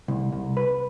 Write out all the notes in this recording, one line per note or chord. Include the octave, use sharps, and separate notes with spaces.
C2
C2
B4